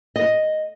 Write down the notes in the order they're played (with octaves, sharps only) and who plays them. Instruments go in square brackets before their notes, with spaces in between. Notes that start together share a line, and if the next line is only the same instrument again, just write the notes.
[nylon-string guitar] D#5